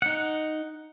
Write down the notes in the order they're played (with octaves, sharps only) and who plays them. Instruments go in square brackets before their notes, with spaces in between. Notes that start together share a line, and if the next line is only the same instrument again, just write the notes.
[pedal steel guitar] D#4 F#5